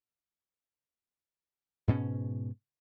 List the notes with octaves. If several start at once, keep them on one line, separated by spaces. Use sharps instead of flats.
G#2 B2 C#4